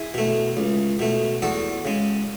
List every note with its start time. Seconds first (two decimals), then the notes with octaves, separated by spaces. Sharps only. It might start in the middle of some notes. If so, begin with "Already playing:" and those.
Already playing: E4 G#4
0.14 B2 A3
0.57 C#2
0.99 B2 A3
1.42 E2 F#4 A4
1.85 C#3 G#3